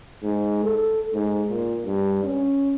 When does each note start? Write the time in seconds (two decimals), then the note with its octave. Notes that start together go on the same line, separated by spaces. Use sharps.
0.23 G#2
0.64 A4
1.14 G#2
1.49 A#2
1.85 G2
2.24 C#4